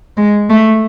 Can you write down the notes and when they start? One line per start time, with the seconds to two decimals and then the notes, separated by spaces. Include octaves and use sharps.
0.17 G#3
0.50 A3